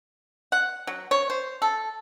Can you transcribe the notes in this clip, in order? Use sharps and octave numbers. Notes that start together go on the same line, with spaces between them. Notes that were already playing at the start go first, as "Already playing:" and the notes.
F#5
F#3
C#5
C5
A4